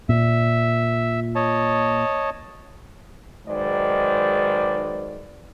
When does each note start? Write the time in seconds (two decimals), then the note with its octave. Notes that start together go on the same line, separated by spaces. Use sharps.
0.09 A#2 E5
1.35 C#5 D#5 A5
3.47 G#2 D#3 F#3 G#3 B4 D5